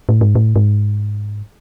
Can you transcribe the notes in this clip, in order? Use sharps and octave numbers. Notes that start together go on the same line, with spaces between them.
A2
G#2
A2
G#2